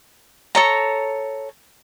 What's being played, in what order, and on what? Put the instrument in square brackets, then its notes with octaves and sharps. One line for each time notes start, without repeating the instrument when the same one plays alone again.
[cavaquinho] A4 C#5 A#5